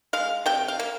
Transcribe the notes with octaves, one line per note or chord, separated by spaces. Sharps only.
G#3 F5
C3 G5
F5
A#3